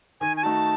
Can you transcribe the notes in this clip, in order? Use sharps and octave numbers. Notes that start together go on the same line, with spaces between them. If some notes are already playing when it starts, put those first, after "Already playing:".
D#3 G#5
G#5
A3 D#4 F#4 A5